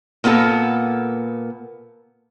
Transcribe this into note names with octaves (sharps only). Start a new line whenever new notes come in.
A#2 A#3 B3 E4 A4